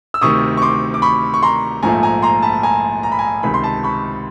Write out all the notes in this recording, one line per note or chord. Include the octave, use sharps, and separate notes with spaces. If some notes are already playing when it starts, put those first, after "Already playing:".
E6
D2 C3 D#3 C#6 D#6
C#6
C6 D6
D6
B5 C#6
C#6
A#5 C6
A#1 G#2 F3 A3 G#5 A#5
G#5 A#5
A#5 C6
A5 B5
G#5 A#5
A#5
B5
G#5 A#5
C#2 C3 D#3 B5
C6
A5 B5
B5 C#6